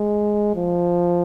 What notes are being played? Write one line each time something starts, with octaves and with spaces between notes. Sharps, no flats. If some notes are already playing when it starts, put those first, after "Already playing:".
Already playing: G#3
F3